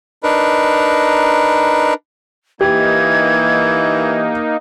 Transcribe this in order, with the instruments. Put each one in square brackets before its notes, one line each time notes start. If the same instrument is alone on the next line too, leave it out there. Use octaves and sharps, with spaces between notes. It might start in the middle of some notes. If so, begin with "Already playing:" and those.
[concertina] D4 D#4 A#4 B4
[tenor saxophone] E3 [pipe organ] A#3 D#4 [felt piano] G4 [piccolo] G#6